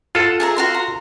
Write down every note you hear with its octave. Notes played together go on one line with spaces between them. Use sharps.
F4 A4 F#5
G#4 E5 A#5
F#4 F5 C6
A#5